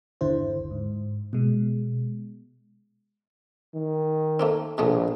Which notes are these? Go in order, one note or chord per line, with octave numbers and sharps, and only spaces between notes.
G1 D#2 D3 E4 C5
G#2
B2 G#3
D#3
A3 A#3 C4
A#1 B2 G#3 A3